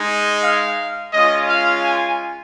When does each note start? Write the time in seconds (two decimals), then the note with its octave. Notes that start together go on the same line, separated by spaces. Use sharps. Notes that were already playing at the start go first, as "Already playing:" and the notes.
Already playing: G#3 D#4
0.43 F5
1.13 G#3 C#4 F4 D#5
1.49 F5
1.83 G#5